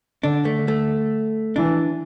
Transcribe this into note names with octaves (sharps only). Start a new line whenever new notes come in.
D3 D4
A3
D3
A3
E3 D4